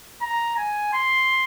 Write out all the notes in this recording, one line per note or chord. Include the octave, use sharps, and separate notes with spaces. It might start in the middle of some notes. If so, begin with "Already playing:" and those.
A#5
G#5
C6